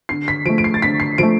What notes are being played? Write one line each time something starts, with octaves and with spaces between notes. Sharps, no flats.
D3 C7
B6
F3 A3 D7
D7
C7
A6
D3 B6
C7
F3 A3 D7